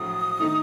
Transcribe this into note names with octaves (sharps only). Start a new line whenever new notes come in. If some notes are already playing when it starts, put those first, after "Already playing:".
Already playing: A#1 A2 F#3 D#6
D#3 A3 D#4